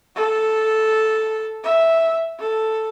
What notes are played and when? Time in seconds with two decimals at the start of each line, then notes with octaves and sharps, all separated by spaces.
0.15 A4
1.64 E5
2.39 A4